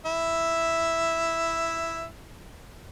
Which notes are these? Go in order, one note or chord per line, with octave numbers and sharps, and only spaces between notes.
E4 E5